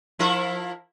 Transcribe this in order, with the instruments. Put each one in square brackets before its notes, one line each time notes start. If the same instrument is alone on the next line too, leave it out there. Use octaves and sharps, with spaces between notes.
[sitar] F3 E4 A#4